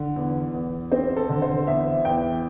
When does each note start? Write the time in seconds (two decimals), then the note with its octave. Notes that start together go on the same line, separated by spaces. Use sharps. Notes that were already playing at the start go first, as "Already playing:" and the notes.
Already playing: D3
0.16 E2
0.54 E2
0.92 C4 C5
1.17 A4
1.29 D3
1.42 C5
1.67 E2 E5
2.05 E2 G5